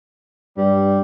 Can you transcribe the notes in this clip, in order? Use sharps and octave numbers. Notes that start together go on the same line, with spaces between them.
G2 G3